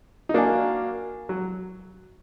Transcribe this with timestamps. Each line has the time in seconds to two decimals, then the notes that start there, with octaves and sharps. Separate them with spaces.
0.29 D#4
0.34 A#3 D4 F#4 A#4 F5 G#5
1.29 F#3